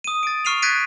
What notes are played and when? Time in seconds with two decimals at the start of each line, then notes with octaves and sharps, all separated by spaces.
0.04 D#6 D#7
0.23 A6 D7
0.45 C#6 F6 C7 D#7 F7
0.62 F#6 G#6 A6 B6 D7 D#7